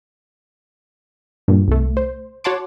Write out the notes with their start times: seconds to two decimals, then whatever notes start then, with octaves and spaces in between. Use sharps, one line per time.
1.48 G2 A#2
1.68 C2 A3
1.97 C5
2.44 F#4 C#5 F#5 A5 C6 D6